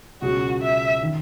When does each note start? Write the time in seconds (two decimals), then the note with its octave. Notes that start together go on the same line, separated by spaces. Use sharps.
0.22 C#2 B2 F#3 C#4 F#4 G#4
0.62 E5
1.03 D#3